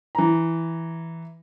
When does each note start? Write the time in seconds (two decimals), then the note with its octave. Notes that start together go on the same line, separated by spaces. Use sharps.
0.15 E3 A#5